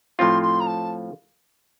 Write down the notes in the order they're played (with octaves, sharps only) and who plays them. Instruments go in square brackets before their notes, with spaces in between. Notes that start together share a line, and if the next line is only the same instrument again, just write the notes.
[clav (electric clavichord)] A2 F3 C4 F4 [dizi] C6
[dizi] C6
A#5
A5